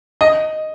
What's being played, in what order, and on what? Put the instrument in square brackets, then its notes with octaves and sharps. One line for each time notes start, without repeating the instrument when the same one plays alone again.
[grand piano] D#5